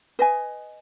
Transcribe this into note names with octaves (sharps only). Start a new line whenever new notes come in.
B4 D#5 G#5